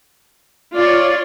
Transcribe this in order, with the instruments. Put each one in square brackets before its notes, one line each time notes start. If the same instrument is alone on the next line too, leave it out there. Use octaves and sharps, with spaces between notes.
[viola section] F4 C#5 [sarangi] D5